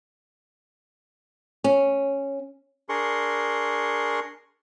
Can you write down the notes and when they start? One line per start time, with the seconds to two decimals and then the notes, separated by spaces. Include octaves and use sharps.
1.64 C#4
2.89 D4 G#4 A#4 C6 C#6